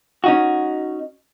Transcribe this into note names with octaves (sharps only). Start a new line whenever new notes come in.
C#4 D#4 F#4